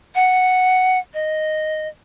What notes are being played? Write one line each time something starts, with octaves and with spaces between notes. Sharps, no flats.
F#5
D#5